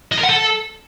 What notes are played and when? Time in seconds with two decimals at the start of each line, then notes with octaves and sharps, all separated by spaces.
0.12 D#5
0.18 A#4
0.23 F#5
0.29 A4